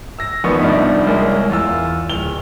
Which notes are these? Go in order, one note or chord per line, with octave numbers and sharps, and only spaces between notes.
E6 A#6
A#1 D#3 F3 B3 B5 C#6
C2 B2 F3 D4 D#4 B5
C2 G#3 A#3 A#4 C#5
E2 F4 E6
D1 F7 G7